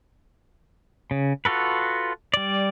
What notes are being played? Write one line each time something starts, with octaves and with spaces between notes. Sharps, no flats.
C#3
F4 F#4 A4 B4
G3 D5